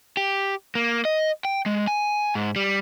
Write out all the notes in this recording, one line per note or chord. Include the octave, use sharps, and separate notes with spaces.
G4
A#3
D#5
G5
G#3
G#5
G#2
G3